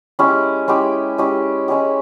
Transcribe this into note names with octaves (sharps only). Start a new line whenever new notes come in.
G#3 C#4 E4 G4
G#3 C#4 E4 G4
G#3 C#4 E4 G4
G#3 C#4 E4 G4